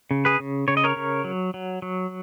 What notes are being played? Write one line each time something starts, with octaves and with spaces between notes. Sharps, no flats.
C#3
G#4 B4
C#3
C#3 C#5
D#5
A#4 C#5
C#3
F#3
F#3
F#3